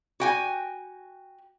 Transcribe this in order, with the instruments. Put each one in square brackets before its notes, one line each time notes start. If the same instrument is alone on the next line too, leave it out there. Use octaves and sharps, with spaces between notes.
[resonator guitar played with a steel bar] F#4 G5 G#5